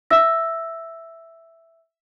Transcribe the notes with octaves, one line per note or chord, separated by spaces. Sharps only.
E5 E6 A#6